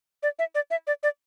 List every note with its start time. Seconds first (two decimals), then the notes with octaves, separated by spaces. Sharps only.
0.23 D5
0.39 E5
0.55 D5
0.71 E5
0.87 D5
1.03 D5